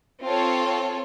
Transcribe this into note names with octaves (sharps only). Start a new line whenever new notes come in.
C4 F4 A4 C#5